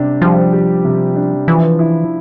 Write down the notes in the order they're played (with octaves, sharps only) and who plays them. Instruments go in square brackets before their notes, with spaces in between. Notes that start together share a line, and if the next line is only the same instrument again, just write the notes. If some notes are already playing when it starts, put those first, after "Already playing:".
Already playing: [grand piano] C3 G3 D4 G4
[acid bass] F3 [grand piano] G3
[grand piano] G4
C3
D4
[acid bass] E3 [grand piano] F3
[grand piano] E4